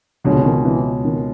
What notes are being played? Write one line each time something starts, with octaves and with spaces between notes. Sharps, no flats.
C#2 B2 D3 G#3 C#4
D3
D#3
E3
D#3